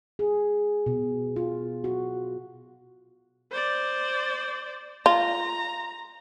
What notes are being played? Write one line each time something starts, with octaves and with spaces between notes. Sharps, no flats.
G#4
B2
F4
F#4
C5 D5
F4 A#5